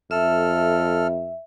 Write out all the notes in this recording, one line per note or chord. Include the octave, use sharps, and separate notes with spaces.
F2 A4 E5 F6